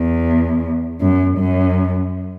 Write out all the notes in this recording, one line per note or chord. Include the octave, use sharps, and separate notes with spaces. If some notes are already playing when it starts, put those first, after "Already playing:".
Already playing: E2
F#2
F#2